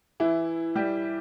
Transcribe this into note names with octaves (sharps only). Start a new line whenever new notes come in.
E3 E4
G3 G4